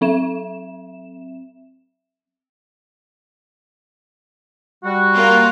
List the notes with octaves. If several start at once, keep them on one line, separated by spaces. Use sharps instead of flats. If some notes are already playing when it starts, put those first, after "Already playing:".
F#3 C4 E5 E7
G3 F#4
A#3 F4